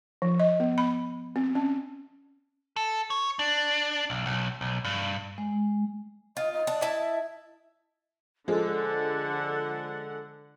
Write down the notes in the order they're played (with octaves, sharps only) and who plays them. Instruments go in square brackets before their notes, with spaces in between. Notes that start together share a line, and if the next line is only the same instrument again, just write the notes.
[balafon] F3
D#5
B3
B5
C4
C#4
[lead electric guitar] A4
C#5
D4
B1
B1
B1
G2
[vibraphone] G#3
[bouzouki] F4 [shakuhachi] D#5
[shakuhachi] D#5
[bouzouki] D4
E4 E5 A5
[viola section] D3 F#5 [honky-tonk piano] F3 G#3 [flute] A4